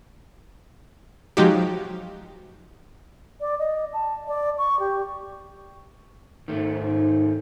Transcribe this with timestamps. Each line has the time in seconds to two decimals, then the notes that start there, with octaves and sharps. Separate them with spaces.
1.37 F3 F#3 G#3 D#4 F#4 G4
3.41 D5
3.59 D#5
3.93 A5
4.28 D5
4.58 C#6
4.80 G4
6.48 G#2 D#3 A3